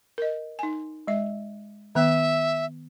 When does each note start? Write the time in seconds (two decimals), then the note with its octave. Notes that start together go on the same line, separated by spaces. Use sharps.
0.18 A#4 D#5
0.59 D#4 G#5
1.07 G#3 E5
1.95 D#3 B3 E5